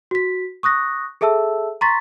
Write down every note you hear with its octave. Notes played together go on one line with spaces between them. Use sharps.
F#4 B6
C#6 D#6 F#6 A#6
G#4 A4 E5 A5 E6
A#5 C6 C#6 A6 B6